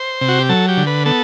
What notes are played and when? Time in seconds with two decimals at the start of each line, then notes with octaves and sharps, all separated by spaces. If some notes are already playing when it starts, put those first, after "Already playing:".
Already playing: C5
0.21 C3
0.28 F#4
0.39 G4
0.49 F#3 A4
0.68 G4
0.77 D3
0.87 B4
1.06 B3 A4